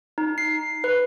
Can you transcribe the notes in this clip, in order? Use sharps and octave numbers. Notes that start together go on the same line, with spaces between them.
D#4
C7
B4